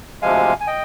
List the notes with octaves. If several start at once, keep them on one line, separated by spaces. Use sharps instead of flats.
D2 C3 F3 G#3 F5 G#5
G#5
D#5 G5